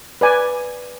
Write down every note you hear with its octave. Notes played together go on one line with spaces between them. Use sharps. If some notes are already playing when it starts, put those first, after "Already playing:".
B4 D5 G#5